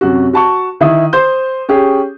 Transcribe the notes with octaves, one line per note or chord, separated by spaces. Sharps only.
F#2 C3 F#4
F#4 A5 C#6
D#3 E4 D#6
C5 C6 G6
C#4 G4 G#4